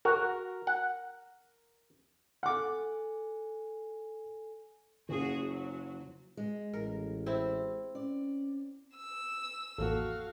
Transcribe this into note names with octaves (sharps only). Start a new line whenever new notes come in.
F#4 A#4
F#5
A4 F#5 G#5 D6
F#1 C#4 F4 F#4 G#4
F#3
G#3
A1 A#4
C4 E4
C#4 D5
E6
A1 F2 A#3 F#4 A4 F5